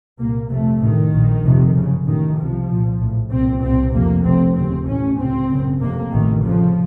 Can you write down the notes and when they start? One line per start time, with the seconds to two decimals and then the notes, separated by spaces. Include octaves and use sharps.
0.19 C2 A#2 A#3
0.50 F1 F2 C3 A3
0.81 A1 A2 D#3
1.12 A#1 A#2
1.44 F1 F2 C3
1.75 F#1 F#2 C#3
2.06 A1 A2 D#3
2.37 C2 C3 F3
2.69 C2 A#2
2.99 A#1 A2
3.30 C2 A#2 C4
3.62 C2 A#2 C4
3.93 F1 F2 C3 A#3
4.24 F1 F2 C3 C4
4.55 F1 D#2 C#3 C4
4.86 A1 A2 C#4
5.18 C#2 C3 C4
5.49 F#1 F#2 C#3
5.80 F1 F2 C3 A#3
6.11 A1 A2 D#3
6.43 F1 F2 C#3 F3